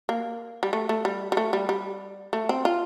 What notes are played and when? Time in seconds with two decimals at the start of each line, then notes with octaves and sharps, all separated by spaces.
0.09 A#3
0.63 G3
0.73 A3
0.89 A3
1.05 G3
1.32 G3
1.37 A3
1.53 G3
1.69 G3
2.33 A3
2.49 C4
2.65 F4